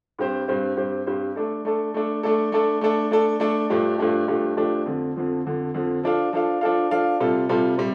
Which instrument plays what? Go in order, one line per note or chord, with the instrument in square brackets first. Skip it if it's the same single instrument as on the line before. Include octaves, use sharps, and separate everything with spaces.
[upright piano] G2 G3 C4 G4 C5
G2 G3 C4 G4 C5
G2 G3 C4 G4 C5
G2 G3 C4 G4 C5
A3 D4 A4
A3 D4 A4
A3 D4 A4
A3 D4 A4
A3 D4 A4
A3 D4 A4
A3 D4 A4
A3 D4 A4
G2 F3 A3 D4 G4
G2 F3 A3 D4 G4
G2 F3 A3 D4 G4
G2 F3 A3 D4 G4
F2 D3 F3
F2 D3 F3
F2 D3 F3
F2 D3 F3
F3 D4 A4 F5
F3 D4 A4 F5
F3 D4 A4 F5
F3 D4 A4 F5
C3 G3 F4 A4
C3 G3 F4 A4
C3 G3